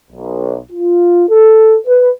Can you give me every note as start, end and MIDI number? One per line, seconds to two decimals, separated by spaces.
0.11 0.59 35
0.71 1.24 65
1.29 1.77 69
1.87 2.11 71